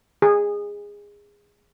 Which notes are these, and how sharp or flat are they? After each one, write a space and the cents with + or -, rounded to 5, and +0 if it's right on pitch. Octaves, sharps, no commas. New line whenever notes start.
G#4 -20